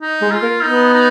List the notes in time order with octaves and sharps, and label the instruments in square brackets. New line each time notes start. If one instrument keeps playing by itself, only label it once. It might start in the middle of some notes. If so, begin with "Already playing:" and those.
[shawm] D#4
[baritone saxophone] G#3
[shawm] F4
[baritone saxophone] A#3
[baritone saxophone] B3 [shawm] D#4
[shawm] D#4